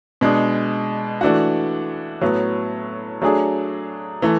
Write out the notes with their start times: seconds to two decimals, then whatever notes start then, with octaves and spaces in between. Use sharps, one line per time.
0.21 B2 G#3 D4
1.21 E3 A3 D4 F#4
2.21 A2 F#3 B3
3.22 F#3 A3 D4 G#4
4.22 E3 A3